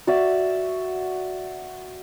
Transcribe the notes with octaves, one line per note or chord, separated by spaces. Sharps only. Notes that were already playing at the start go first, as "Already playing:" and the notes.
F#4 D5 E5